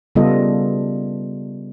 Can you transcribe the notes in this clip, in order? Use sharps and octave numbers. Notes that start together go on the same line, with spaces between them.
C#3 G3 B3 F4 A4 D#5